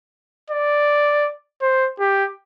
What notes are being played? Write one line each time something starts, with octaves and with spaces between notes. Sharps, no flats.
D5
C5
G4